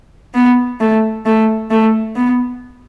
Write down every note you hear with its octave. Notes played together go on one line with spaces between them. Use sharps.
B3
A3
A3
A3
B3